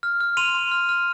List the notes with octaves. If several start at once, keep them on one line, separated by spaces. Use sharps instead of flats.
F6
F6
C6 D#7 F7
C6
F6
F6